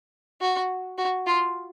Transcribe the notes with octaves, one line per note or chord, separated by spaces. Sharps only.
F#4
F#4
F4